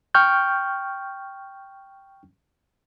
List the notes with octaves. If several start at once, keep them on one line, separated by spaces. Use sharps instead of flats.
G5 C#6 F6 G6